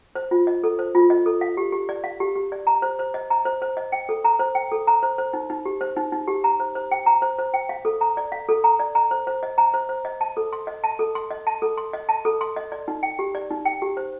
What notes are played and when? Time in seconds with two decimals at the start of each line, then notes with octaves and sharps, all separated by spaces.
0.15 C5
0.31 F4
0.47 D#5
0.64 A4
0.79 C5
0.95 F4
1.10 D#5
1.26 A4
1.41 F5
1.57 G4
1.72 G4
1.89 D5
2.04 F5
2.20 G4
2.36 G4
2.52 D5
2.67 A#5
2.82 C5
2.99 C5
3.14 D#5
3.30 A#5
3.45 C5
3.62 C5
3.77 D#5
3.92 G5
4.09 A4
4.24 A#5
4.39 C5
4.55 G5
4.72 A4
4.87 A#5
5.03 C5
5.18 C5
5.33 D#4
5.50 D#4
5.65 G4
5.81 C5
5.96 D#4
6.12 D#4
6.28 G4
6.44 A#5
6.60 C5
6.75 C5
6.91 G5
7.06 A#5
7.22 C5
7.38 C5
7.54 G5
7.69 F5
7.85 A4
8.01 A#5
8.17 D5
8.32 F5
8.49 A4
8.64 A#5
8.80 D5
8.95 A#5
9.11 C5
9.27 C5
9.43 D#5
9.58 A#5
9.74 C5
9.89 C5
10.05 D#5
10.21 A5
10.37 A4
10.53 C6
10.67 D#5
10.84 A5
10.99 A4
11.15 C6
11.31 D#5
11.47 A5
11.62 A4
11.77 C6
11.93 D#5
12.09 A5
12.25 A4
12.41 C6
12.56 D#5
12.72 D5
12.88 D#4
13.03 G5
13.19 G4
13.35 D5
13.51 D#4
13.65 G5
13.82 G4
13.97 C5